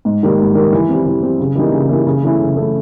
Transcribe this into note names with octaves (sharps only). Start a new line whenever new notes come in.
G#2
D#3 G3 A#3
G#2
D#3 G3 A#3
E3
G3 C4
E3
G3 C4
C#3
E3 G3 A#3 D#4
C#3
E3 G3 A#3 D#4
C#3
E3 A3 C#4 E4
C#3
E3 A3 C#4 E4